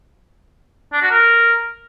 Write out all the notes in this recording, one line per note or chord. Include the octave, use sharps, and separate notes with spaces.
D4
F#4
A#4